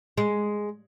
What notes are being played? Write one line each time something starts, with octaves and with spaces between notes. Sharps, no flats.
G#3